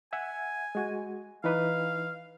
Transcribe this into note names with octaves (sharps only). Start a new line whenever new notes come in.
E5 F#5 G#5
G#3 F#4
E3 D#4 B4 F5